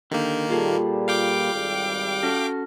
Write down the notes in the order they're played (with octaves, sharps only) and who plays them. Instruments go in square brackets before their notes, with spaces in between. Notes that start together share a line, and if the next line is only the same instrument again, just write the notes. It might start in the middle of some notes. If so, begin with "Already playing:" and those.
[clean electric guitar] D3 G4 [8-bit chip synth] D#3 A#3
[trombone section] A#2 G3 [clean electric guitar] F4 G#4 A4
[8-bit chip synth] F5 G5 D6
[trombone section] G#1 G3
[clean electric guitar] C#4 F#4 A4